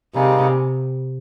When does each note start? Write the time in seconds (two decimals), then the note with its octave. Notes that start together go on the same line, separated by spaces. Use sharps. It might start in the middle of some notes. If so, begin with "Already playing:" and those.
0.15 C3 G3 A#3 D#4 G#4